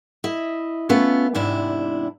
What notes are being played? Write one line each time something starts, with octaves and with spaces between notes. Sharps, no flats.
E4 D#5
A3 B3 C#4 F4
E2 G#2 C3 D4 E4